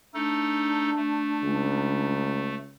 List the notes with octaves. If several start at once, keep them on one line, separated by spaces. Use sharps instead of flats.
A3 D4 D#4 A4
A3
C#2